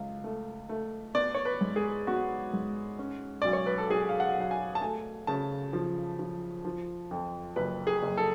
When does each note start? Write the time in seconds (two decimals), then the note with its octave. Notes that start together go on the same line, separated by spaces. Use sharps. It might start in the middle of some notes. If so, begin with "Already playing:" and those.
Already playing: C#2 F5
0.24 A3
0.69 A3
1.14 B3 D5
1.35 C#5
1.45 B4
1.61 G#2
1.76 G#4
2.07 B3 F#4
2.53 G#2
2.99 C#4
3.42 B1 D5
3.53 C#5
3.66 B4
3.78 A4
3.89 B1 G#4
4.09 F5
4.20 F#5
4.36 B1 F#5
4.51 G#5
4.75 A5
4.81 A3 G#5
5.27 C#3 A5
5.73 F3
6.19 F3
6.65 F3
7.11 F2
7.56 F#1 B4
7.87 G#4
8.03 F#1
8.17 A4